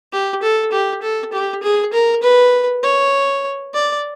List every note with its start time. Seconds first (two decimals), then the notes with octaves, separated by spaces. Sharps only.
0.13 G4
0.43 A4
0.72 G4
1.03 A4
1.33 G4
1.63 G#4
1.93 A#4
2.23 B4
2.84 C#5
3.74 D5